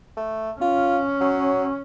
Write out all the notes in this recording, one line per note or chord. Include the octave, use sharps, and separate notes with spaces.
A3
C#4 F4
F#3